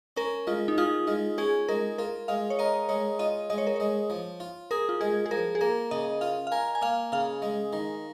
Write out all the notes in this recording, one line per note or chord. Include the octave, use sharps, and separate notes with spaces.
C#4 A#4
G#3 F4
D#4
F4 G#4
G#3 F4
C#4 G#4
G#3 A#4
F4 A#4
G#3 F5
C#5
A#4 D#5
G#3 C#5
F4 D#5
G#3 D#5
C#5
A#4
G#3 C#5
F3
F4
G#4 A#4
F4
G#3 G#4
G#4
F3 A#4
G#4
A#3 A#4
C#3 D#5
F4 F5
F5
A#4 G#5
G#5
A#3 F5
C#3 F5
G#3
D#3